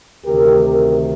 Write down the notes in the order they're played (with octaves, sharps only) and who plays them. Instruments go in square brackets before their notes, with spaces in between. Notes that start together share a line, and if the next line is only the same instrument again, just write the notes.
[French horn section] D2 C3 D#3 G4 A#4